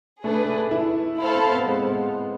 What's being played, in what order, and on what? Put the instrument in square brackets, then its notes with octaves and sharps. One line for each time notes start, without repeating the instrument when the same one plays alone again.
[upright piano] A3 [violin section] D4 G#4 B4
[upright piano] A3
E4
[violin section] E4 A4 C5 F5 A5
[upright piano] C4
B3
G#3
B3